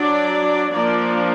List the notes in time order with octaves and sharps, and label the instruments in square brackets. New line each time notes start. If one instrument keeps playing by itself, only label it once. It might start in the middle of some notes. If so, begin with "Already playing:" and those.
Already playing: [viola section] F#3 D4 D5
F3 A#3 D4 D5